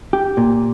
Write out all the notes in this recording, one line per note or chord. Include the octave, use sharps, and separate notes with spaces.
G4
A#2